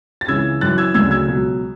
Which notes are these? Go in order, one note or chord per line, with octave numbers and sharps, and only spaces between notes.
A6
C#2 C#3 E3 E6 G#6
F#2 E3 F#6 A6
E6 G#6
D2 C#3 F#3 E6 G#6
E6 G#6
C#2 B2 F#3